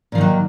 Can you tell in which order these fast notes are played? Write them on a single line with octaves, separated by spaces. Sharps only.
A#2 F3 D#3 F#3